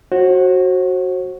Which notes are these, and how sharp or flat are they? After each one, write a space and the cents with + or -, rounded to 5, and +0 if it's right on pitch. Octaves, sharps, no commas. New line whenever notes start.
F#4 +0 C5 +40